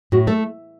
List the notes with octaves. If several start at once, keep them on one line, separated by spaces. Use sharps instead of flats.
A2 F#4
A3 A4